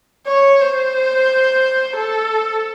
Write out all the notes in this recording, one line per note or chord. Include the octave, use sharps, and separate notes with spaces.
C#5
C5
A4